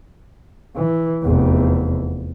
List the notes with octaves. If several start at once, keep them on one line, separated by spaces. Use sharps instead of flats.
E3
F1 E2